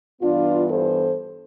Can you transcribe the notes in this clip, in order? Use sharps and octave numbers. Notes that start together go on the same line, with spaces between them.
G2 E3 B3 D4 F4
A4 C5